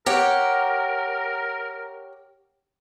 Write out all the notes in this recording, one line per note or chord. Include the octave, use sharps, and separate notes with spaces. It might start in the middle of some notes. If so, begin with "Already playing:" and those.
G4 A#4 C#5 F#5